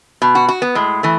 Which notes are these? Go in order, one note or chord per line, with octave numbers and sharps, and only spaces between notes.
B2
F#4
F#4
B3
A2 G#3
E3 A3